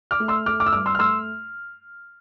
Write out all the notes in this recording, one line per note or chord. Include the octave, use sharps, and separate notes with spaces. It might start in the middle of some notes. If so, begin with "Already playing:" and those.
D6 F6
A3
C6 E6
A3 D6 F6
D6 F6
E6
G2 D6 F6
C6 E6
F6
A3 C6 E6